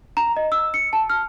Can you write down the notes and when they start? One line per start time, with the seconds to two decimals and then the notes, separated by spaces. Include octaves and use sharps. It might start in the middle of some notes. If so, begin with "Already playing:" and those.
0.17 A#5
0.37 D#5
0.52 E6
0.74 C#7
0.93 A5
1.10 F6